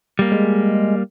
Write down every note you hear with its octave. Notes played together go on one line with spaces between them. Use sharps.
G3 A#3
G#3